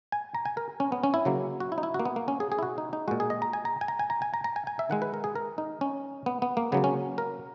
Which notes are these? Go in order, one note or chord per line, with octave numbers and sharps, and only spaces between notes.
G#5
A#5
G#5
A#4
C#4
B3
C#4
E4
C#3 F#3 A#3
F#4
E4
D#4
E4
F#4
A#3
B3
A#3
C#4
G#4
G#4
E4
F#4
D#4
D#4
A#2 G#3 F#4
G#4
D#5
A#5
G#5
A#5
G#5
A#5
G#5
A#5
G#5
A#5
A#5
G#5
G#5
E5
D#3 G#3 F#5
B4
A#4
G#4
A#4
D#4
C#4
B3
B3
A#3
C#3 F#3 A#3 B3
C#4
A#4